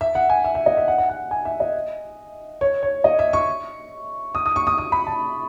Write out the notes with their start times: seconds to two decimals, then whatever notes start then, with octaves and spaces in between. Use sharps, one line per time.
0.01 E5
0.15 F#5
0.30 G#5
0.44 E5
0.55 E5
0.66 D#5
0.77 E5
0.88 F#5
0.98 F#5
1.09 F#5
1.31 G#5
1.45 E5
1.60 D#5
2.61 C#5
2.83 C#5
3.04 D#5
3.19 E5
3.33 C#6
4.35 D#6
4.46 D#6
4.56 C#6
4.67 D#6
4.78 D#6
4.92 B5
5.07 A5